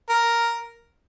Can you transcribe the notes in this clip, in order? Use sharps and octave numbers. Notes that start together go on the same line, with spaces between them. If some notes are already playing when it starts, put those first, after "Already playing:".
A#4